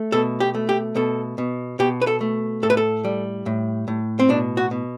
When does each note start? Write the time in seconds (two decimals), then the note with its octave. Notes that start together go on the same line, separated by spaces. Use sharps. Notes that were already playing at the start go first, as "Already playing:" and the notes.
Already playing: A3
0.12 B2 A4
0.40 G4
0.55 A3
0.69 G4
0.96 B2 A4
1.38 B2
1.79 B2 G4
2.02 B4
2.07 A4
2.21 A3
2.63 A2 A4
2.70 B4
2.77 A4
3.05 G3
3.46 A2
3.88 A2
4.20 C4
4.29 B2 D4
4.57 F#4
4.71 B2